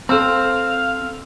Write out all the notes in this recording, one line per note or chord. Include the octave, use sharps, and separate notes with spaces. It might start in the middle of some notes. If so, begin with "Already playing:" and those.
C4 A4 C5 F5 E6